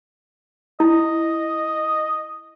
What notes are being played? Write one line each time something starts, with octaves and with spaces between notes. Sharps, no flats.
E4 D#5